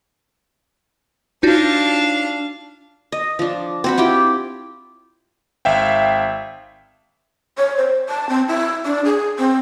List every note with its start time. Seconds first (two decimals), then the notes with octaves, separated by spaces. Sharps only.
1.43 D4 D#4 F4 F#4 F5
3.12 D#5
3.39 F3 D4
3.84 C4 F#4 B5
3.98 E4 F4 G4 G5
5.65 G#1 E5 F5 G5
7.58 C#5
7.77 C5
8.09 A5
8.29 C4
8.48 E4
8.85 D4
9.05 G#4
9.39 C4